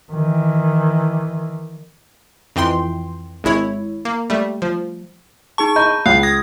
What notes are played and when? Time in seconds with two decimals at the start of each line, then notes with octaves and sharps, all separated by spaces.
0.12 D#3 E3
2.56 F2 E3 G5 C6
3.44 G#1 G#3 E4 C#5
4.05 A#3
4.30 G3 A3
4.62 F3
5.58 D#4 G#4 A5 C#6
5.76 D#5 A#5 B5 G6
6.06 C#2 F5 F#6
6.23 D#6 G#6 A#6